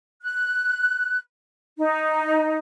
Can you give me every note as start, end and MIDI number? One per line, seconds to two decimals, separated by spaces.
0.22 1.18 90
1.78 2.57 63